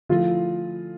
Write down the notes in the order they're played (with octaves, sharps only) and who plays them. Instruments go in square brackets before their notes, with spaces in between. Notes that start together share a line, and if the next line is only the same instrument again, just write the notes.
[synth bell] D3 F3 A3 E4 A4 [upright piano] F4